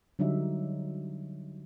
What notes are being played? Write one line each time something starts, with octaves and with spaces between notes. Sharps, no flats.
D3 F#3 G3 D#4 E5